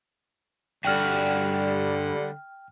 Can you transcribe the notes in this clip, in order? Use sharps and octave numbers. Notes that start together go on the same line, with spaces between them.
G2 D3 G3 F#4 G5 F6